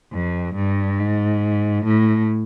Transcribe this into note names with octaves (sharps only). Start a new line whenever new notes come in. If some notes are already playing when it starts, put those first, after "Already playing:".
F2
G2
G#2
A2